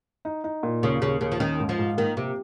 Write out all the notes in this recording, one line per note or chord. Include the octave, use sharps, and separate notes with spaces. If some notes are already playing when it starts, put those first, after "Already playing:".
D#4
D#4
A#2
D#2 C#3
D#2 C#3
D#2 C#3
F3
D#3 C#4
G#2
F3
G#2
D#3 A#3
C3 A#3